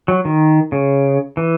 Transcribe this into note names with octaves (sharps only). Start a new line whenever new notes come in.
F#3
D#3
C#3
E3